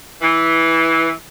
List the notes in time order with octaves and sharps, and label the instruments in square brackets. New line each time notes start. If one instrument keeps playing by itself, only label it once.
[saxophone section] E3